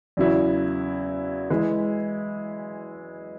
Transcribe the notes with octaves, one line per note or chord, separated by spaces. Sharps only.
E2 C#3 F#3 E4
E3 G#3 E4